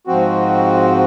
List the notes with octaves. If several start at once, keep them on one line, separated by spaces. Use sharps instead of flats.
G#2 F3 C4 F#4